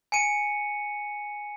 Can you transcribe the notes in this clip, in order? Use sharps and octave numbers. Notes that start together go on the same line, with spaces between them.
G#5 C#7 D#7